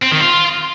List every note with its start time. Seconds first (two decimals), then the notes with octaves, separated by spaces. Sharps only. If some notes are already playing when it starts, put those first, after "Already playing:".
0.02 C4
0.11 D#3
0.20 F4